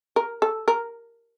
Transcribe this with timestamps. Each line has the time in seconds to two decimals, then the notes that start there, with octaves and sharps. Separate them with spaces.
0.16 A#4
0.42 A4
0.68 A#4